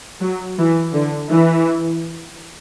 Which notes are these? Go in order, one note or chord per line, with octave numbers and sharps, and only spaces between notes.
F#3
E3
D3
E3